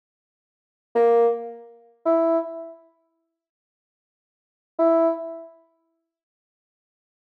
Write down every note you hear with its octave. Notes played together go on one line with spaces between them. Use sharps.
A#3
E4
E4